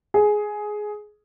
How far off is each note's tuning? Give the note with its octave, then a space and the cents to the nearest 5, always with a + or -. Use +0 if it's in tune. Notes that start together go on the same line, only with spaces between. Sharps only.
G#4 +10